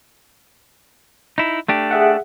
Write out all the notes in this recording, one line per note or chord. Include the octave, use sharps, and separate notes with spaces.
D#4 E4
A3 D4 G4
G#4 E5 F#5